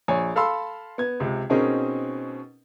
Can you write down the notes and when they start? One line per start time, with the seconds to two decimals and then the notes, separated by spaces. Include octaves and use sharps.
0.08 A#1 C#5 G#5
0.36 A4 F5 B5 C6 E6
0.98 B3 G#6
1.20 C#2 C3
1.50 B2 C4 C#4 D#4 G#4 A#4